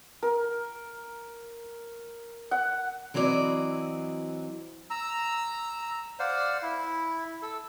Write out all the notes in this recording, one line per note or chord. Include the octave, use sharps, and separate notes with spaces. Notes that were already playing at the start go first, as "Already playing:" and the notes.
A#4
F#5
E3 F#3 C4 E4 D5 D#5
A#5 E6
C5 D5 F5 F#5
E4
A4